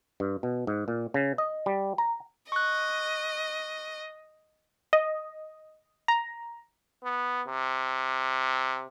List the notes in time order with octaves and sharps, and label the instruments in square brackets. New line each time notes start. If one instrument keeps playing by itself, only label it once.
[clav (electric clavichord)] G2
B2
G#2
A#2
C#3
D#5
G3
A#5
[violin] D#5 [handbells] C#6 F#6
[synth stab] D#5
A#5
[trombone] B3
C3